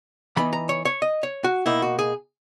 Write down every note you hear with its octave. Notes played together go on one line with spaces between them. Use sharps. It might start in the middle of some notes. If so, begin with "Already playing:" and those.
E3 B3 D#4 B5
A#5
C#5
C#5
D#5
C#5
F#4
B2 A#3 D#4 E4
F#4
G#4